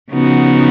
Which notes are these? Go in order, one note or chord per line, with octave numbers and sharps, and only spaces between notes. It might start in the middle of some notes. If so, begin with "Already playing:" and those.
C#3 F3 B3 D#4 F#4